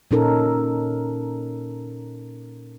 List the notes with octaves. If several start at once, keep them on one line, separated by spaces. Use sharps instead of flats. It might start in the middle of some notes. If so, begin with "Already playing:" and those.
A#2 C#4 D#4 A4 A#4